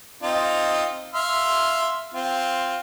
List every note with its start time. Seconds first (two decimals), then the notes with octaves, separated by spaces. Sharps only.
0.23 C4 D#4 F4
1.14 E5 F5 C6
2.14 C4 F4